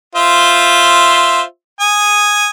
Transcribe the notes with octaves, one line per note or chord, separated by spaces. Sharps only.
F4 C5 E5
G#5 D#6